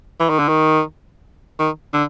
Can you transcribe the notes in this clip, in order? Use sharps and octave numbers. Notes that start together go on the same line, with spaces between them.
E3
D#3
D3
D#3
D#3
D3